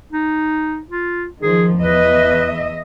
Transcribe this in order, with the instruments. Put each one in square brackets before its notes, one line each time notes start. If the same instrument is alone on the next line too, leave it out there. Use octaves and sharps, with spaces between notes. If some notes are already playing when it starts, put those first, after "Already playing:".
[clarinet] D#4
F4
[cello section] D#3 F3 [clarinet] G#4
[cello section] E2 D#5 E5 [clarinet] B4